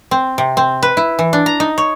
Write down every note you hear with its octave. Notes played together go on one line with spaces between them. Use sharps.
C4
C3
C4
B4
E4
E3
D4
A#5
D#4
C#5